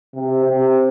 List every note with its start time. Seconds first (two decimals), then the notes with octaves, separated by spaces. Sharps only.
0.15 C3
0.44 C3